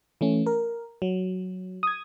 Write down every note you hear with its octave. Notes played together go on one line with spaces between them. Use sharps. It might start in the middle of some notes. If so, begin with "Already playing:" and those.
E3 A3 C#4
A#4
F#3
D#6 G#6